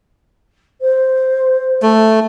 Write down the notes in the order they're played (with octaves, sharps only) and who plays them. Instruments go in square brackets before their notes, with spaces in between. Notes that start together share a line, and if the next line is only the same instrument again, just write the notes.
[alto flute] C5
[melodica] A3